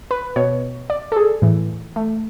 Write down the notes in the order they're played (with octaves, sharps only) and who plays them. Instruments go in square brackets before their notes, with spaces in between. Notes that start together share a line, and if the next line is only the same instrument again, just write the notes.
[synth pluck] B4
B2 C#5
D5
A4
G#4
A2 E3
A3